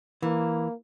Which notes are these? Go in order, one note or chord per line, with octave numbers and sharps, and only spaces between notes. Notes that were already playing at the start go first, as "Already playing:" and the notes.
E3 A#3